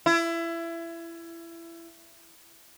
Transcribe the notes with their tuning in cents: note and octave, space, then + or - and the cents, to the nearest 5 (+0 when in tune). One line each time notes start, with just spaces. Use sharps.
E4 +25